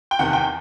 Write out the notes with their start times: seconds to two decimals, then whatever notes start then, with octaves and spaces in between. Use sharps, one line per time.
0.11 G5
0.19 E2 C3 D#3 F#5
0.33 G5